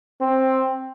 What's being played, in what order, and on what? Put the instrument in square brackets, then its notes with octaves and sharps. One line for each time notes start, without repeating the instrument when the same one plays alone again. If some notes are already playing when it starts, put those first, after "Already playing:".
[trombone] C4